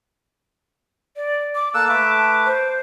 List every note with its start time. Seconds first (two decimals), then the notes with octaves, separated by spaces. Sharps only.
1.16 D5
1.55 D6
1.74 A#3 A4 E6 F#6
1.89 A3 B4 A5 D6
2.46 C5